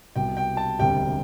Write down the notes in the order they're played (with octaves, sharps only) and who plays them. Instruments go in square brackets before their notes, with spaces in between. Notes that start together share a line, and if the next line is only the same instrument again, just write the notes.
[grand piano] C2 B2 G3 G5
G5
A5
E1 D2 C3 G3 G5